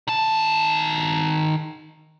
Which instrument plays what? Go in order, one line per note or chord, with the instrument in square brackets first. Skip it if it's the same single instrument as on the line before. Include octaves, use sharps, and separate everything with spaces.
[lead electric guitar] D#3 A5